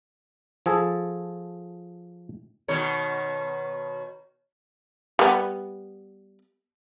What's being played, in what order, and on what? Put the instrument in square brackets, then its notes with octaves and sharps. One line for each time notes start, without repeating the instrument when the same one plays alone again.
[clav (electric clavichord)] F3 G#4 A4
[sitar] B2 D#3 C#5
[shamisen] G3 B3